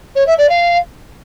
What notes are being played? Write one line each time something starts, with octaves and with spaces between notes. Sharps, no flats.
C#5
E5
D5
F5